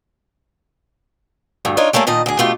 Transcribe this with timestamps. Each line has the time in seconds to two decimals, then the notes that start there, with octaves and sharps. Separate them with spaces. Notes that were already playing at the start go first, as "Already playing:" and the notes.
1.65 D2 G2 A3
1.77 D4 D#4 F4 C#5
1.93 G3 A3 A#3 C#4 A4
2.07 A#2 D#3 D#5 A5
2.26 D2 G#4
2.39 B2 A3 F4 G4